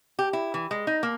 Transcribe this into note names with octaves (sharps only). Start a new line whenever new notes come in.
G4
E4
E3
G#3
D#4
A#3